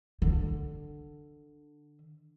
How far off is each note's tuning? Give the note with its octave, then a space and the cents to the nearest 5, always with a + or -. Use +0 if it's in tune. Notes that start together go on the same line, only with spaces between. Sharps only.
D3 +10